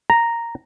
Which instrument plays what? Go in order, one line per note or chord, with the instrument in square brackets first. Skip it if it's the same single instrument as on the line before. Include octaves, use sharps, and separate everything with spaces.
[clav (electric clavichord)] A#5